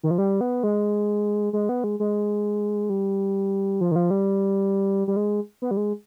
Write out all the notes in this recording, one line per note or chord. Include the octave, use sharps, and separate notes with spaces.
D#3
F3
G3
B3
G#3
G#3
B3
G#3
G#3
G3
F3
D#3
F3
G3
G3
G#3
B3
G3
G#3